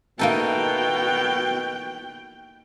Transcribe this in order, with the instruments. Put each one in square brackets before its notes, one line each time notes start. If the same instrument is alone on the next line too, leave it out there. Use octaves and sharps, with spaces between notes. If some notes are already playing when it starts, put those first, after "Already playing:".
[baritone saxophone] B2 [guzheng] A#3 D#4 A4 [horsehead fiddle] G5